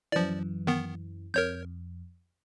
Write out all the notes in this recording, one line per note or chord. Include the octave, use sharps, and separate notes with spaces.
F#2 E3 F3 D5
D#3 B3
F2 A#4 C#5 G6